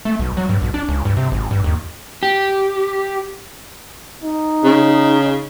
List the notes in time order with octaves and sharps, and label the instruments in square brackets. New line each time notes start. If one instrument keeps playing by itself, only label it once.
[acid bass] A3
B1
F#3
G2
B1
D4
C#2
G2
C3
G#1
G2
D#2
[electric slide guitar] G4
[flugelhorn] D#4
[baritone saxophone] C#3